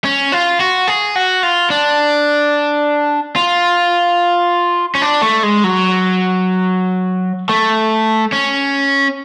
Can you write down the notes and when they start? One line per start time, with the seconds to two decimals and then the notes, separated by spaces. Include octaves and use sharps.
0.05 C#4
0.32 F4
0.60 F#4
0.88 G#4
1.16 F#4
1.43 F4
1.70 D4
3.36 F4
4.95 C#4
5.02 D4
5.22 A3
5.43 G#3
5.64 F#3
7.49 A3
8.32 C#4